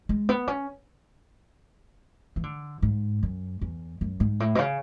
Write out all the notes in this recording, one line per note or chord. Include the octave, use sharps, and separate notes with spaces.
G#3
B3
C#4
E3
D3
G#2
F#2
E2
F#2
G#2
A2
B2
C#3